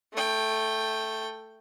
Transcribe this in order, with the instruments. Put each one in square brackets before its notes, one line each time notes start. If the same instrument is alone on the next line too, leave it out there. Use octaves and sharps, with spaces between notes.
[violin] A3 G5